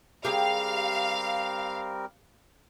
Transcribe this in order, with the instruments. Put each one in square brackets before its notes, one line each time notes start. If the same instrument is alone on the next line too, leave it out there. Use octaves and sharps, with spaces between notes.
[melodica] G3 C4 A#4 [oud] G4 G#4 [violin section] F5